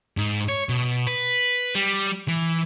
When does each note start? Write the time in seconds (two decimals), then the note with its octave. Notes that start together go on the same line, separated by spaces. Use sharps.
0.17 G#2
0.48 C#5
0.69 B2
1.07 B4
1.75 G3
2.28 E3